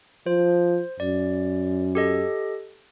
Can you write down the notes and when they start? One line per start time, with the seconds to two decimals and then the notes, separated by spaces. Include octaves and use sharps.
0.26 F3 C5
1.00 F#2 D5
1.95 G4 A4 D#5